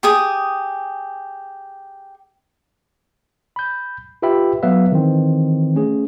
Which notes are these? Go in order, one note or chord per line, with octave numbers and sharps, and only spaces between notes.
G4 G#4 D#6
B5 G6
F4 G4 B4 E5 G5 B5
F#3 B3 B4 E5 F5
D#3 E3 C4
A3 C#4 G#4